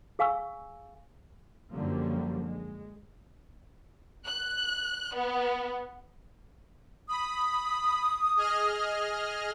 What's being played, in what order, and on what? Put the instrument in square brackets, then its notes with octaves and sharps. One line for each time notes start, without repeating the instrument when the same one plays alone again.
[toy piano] G#4 F5 G#5 C#6 E6
[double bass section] F#2 D3 F3 G3 A#3
G#3
[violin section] F#6
B3
[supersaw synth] B5 [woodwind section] D#6
[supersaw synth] G#4 D#5 F6